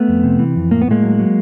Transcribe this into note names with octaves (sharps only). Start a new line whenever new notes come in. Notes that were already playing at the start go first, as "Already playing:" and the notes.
Already playing: A3 B3
F2
C3
E3
F2
A2 A#3
B3
A2 G#3 A#3
F#3
F#3